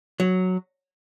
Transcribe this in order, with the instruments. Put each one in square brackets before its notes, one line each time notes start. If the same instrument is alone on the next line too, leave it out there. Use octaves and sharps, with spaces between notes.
[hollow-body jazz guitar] F#3